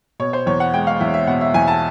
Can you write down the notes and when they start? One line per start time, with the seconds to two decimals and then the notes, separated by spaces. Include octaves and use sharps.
0.20 B2 C#5
0.33 C5
0.46 E2 C#5
0.60 F#5
0.74 G#3 G5
0.87 F5
1.01 E2 E5
1.14 E5
1.27 B2 F#5
1.41 E5
1.54 E2 G#5
1.68 A5